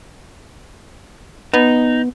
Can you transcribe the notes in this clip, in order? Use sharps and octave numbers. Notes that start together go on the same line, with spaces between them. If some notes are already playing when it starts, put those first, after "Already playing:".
B3 D#4